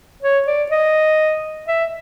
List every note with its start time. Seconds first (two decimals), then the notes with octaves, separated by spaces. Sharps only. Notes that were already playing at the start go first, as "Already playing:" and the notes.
0.23 C#5
0.47 D5
0.71 D#5
1.68 E5